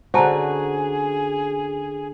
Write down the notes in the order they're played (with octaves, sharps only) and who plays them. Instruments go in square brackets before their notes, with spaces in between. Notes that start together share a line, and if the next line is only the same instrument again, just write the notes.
[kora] D3 C#4 F#4 [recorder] G#4 [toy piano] C5 A5 A#5